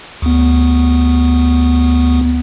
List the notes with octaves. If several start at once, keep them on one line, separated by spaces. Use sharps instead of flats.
D2 B3